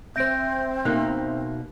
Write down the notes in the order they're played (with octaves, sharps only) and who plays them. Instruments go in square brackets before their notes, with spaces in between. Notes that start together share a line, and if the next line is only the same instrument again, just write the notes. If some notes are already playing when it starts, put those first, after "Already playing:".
[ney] C4 [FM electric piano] C5 E5 [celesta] G6 A#6 D7
[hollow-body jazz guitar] B2 A#3 D#4 [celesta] F#6